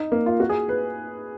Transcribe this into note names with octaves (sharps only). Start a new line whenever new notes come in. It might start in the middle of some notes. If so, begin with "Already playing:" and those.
Already playing: D#4
A#3
F4
F#4
G#4
B4